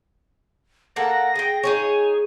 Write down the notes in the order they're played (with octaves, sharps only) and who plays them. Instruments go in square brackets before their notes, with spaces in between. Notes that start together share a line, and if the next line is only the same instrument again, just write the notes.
[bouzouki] A#3 A4 F#5 [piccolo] A#6
[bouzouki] G#4 G5
[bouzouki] D#4 G#4 C#5 [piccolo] G#5